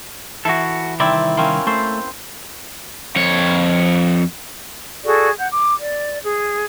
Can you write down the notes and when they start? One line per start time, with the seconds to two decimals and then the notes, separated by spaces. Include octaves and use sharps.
0.45 E3 F#4 A4
1.00 C2 D#3 C4 E4 D5
1.37 A#3 C4 C#4
1.67 A3 C5
3.16 F2 C#5
5.03 F#4 G#4 A4 D5
5.39 F#5 G6
5.53 D6
5.78 D5
6.24 G#4